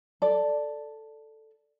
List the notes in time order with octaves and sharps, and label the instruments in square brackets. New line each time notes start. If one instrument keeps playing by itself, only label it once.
[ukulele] A4 D5